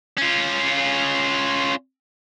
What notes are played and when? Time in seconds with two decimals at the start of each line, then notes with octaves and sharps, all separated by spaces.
0.18 C#4 F4